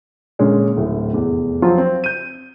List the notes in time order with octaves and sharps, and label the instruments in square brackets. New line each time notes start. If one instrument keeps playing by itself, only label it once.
[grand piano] A#2 D3 G#3 C#4
D1 A2
F1 E2
F3 F#3 C4 F4
C4
G6 D#7